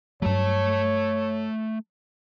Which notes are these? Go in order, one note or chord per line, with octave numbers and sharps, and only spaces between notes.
G2 F#3 A3 C#5 A5